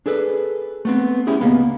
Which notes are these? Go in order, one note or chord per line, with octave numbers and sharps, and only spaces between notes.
D4 G#4 A4 B4
A3 B3 C4
C#4 E4 G4 G#4
C#2 A#3 B3